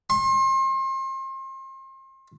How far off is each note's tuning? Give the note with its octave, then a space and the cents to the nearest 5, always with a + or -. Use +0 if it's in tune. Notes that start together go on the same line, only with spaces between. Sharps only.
C6 +35